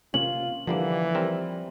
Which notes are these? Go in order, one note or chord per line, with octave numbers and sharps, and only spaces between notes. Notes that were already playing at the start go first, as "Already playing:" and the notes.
C3 A#3 C#4 F4 F#7
D3 E3 F3 G3 A#3
G3 C4 A#4